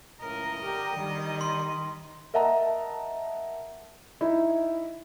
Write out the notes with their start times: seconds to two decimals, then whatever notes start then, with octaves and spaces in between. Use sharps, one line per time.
0.21 C#2 A2 A#4 D#5
0.62 D3 G4 A#4
0.96 D#3 G3
1.41 C6
2.34 A#4 D#5 E5 F#5 A5 A#5
4.21 D#4 E4